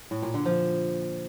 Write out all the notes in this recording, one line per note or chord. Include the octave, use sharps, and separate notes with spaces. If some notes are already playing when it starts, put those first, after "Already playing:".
A2
A#2
D3
F3